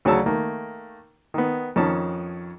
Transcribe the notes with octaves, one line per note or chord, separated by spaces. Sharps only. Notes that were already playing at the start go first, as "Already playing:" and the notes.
D2 C#3 F#3 C#5 A5 E6
D#3 A3 A#3
D#3 B3
F2 D#3 C#4 A5